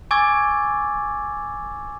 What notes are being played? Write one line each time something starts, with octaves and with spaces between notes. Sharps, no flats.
G#5 C#6 D6 E6 G#6 A6